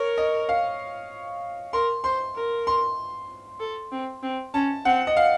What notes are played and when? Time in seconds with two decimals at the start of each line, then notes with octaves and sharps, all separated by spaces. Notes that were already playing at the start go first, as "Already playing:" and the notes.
Already playing: A#4 C#5
0.18 D#5
0.49 F5
1.73 A#4 C6
2.04 C5 C6
2.35 A#4
2.67 C6
3.60 A4
3.92 C4
4.22 C4
4.54 C#4 A5
4.85 C4 F#5
5.07 D#5
5.17 F5